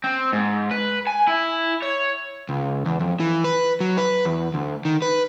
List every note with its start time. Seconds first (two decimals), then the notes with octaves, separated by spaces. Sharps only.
0.04 C4
0.33 G#2
0.71 B4
1.07 G#5
1.27 E4
1.83 C#5
2.49 C#2
2.85 E2
3.00 F2
3.20 E3
3.44 B4
3.81 F#3
3.98 B4
4.25 E2
4.54 D2
4.85 D#3
5.02 B4